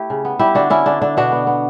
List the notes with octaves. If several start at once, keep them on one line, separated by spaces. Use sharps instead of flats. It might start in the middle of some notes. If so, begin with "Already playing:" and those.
Already playing: A3 E4 G4
C#3
B3
G3 E4 G4
D3 D4 F#4
D3 C#4 E4
D3 D4
D3 D4
B2 D4 F#4
B3
B3